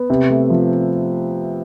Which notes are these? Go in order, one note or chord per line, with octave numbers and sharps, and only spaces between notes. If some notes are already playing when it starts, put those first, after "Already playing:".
Already playing: B3
C3
A3
F3